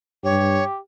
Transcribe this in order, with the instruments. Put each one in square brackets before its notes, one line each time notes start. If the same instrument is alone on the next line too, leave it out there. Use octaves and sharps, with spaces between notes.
[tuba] G2 [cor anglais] G4 [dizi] C#5